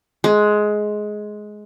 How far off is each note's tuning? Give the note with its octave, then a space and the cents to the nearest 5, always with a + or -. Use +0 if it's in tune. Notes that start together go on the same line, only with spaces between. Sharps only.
G#3 +15